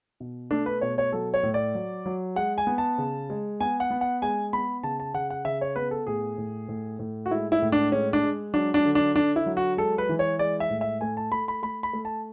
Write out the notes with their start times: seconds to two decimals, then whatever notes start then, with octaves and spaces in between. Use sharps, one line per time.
0.20 B2
0.51 A3 D4
0.66 B4
0.81 B2 C#5
0.98 C#5
1.12 F#3 A4
1.34 C#5
1.43 A2
1.54 D5
1.75 F#3
2.06 F#3
2.36 G#3 F#5
2.58 G#5
2.67 B3
2.78 A5
2.98 C#3
3.30 G#3
3.60 B3 G#5
3.80 F#5
3.91 B3
4.01 F#5
4.22 G#3 G#5
4.53 B3 B5
4.83 C#3 A5
5.00 A5
5.14 C#3 F#5
5.30 F#5
5.45 C#3 E5
5.61 C#5
5.76 B3 B4
5.91 A4
6.07 A2 G#4
6.38 A2
6.69 A2
6.99 A2
7.26 F#4
7.31 G#3 E4
7.52 E4
7.62 A2
7.72 D4
7.92 G#3 C#4
8.13 D4
8.23 G#3
8.54 F#3 D4
8.74 D4
8.85 D3
8.95 D4
9.15 D3 D4
9.36 E4
9.46 F#3
9.57 F#4
9.77 G#3 A4
9.98 B4
10.09 E3
10.19 C#5
10.39 G#3 D5
10.60 E5
10.70 A2
10.81 E5
11.01 A3 G#5
11.17 A5
11.32 A3 B5
11.48 B5
11.62 A3 B5
11.83 B5
11.93 A3
12.05 A5